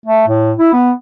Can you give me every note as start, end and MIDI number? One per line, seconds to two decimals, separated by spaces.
0.06 0.24 57
0.28 0.52 45
0.57 0.70 64
0.73 0.91 59